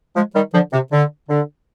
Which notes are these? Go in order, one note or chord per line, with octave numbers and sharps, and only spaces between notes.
F3 G#3
D#3 G3
D3 F3
C3
D3
D3